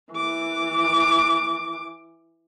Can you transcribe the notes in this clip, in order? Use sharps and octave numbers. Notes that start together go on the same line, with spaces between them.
E3 D6